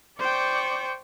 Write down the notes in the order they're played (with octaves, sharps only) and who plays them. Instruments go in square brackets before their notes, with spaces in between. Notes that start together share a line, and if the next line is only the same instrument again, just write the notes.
[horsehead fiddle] C5 G5 [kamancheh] D5 C#6